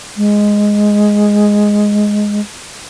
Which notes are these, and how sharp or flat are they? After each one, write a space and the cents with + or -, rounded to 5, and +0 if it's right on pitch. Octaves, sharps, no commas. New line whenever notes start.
G#3 +0